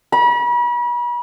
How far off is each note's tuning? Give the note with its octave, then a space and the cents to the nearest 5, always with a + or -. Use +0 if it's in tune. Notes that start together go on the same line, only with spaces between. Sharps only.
B5 -40